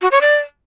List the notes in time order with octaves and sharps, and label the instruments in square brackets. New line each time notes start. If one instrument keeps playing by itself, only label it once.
[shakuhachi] F#4
C#5
D5